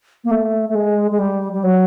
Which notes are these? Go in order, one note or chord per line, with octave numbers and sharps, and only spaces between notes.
A#3
A3
A3
G#3
G#3
G3
G3
F#3